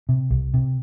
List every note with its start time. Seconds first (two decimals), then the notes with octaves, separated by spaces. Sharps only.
0.09 C3
0.31 C2
0.54 C3